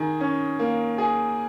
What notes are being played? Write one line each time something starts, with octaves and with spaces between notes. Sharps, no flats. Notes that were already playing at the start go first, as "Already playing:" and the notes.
Already playing: D#3 G#4
C#4
A#3
G#4